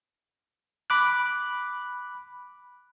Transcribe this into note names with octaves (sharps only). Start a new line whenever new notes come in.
B5 D6 F#6